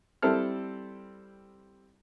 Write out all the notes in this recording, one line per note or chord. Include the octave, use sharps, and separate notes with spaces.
G3 C4 E4 A4 F6